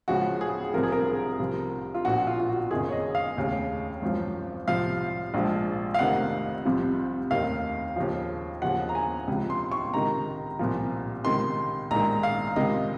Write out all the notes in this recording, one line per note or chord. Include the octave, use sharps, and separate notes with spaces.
C#2 C#3 F3 F#4
G#4
C2 C3 F3 A#4
G#4
A#4
C2 C3 F3
F4
A#1 A#2 F3 F#4
F4
F4
F#4
F#1 F2 D#3 G#4
C#5
D#5
F5
F1 D#2 C#3
G#1 F#2 F3
C2 C3 F3 F5
A#1 G#2 F3
F5
F1 F2 C3 D#3 F#5
C2 C3 F3
F1 D#2 D#3 F5
D#2 C#3 F3
D#2 C#3 F3 F#5
A#5
G#5
C#2 C3 F3
C6
C#6
C#2 C3 D#3 A#5
C2 A#2 F3
C#2 C3 D#3 C6
A#1 G#2 D#3 A#5
F5
C#2 C3 D#3 D#5